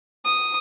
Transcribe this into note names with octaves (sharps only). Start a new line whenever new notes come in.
D#6